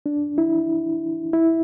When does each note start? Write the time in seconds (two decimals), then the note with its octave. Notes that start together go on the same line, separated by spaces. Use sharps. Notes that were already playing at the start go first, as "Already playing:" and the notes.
0.06 D4
0.38 E4
1.33 E4